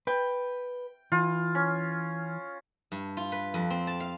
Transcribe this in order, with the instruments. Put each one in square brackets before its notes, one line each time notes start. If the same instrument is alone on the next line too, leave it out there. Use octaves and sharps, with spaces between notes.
[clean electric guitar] B4 [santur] G5
[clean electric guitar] E3 [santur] F4
[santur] C#4
[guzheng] G2
F4
B4
F2
C4
A5
F5